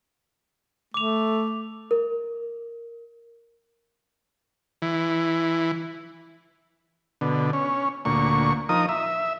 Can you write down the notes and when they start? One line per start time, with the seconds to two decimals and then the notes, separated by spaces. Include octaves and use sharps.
0.94 A3 D6 F7
1.91 A#4
4.82 E3
7.21 B2 D3
7.53 C#4
8.05 D2 A#2 C#6
8.69 F3 D#4 A#4 D#6
8.89 E5